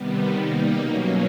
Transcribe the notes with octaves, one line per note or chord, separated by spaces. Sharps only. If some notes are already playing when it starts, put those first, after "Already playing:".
Already playing: C3 D#3 G3 B3
G3 A#3 D#4
B2 F#3 A#3 C#4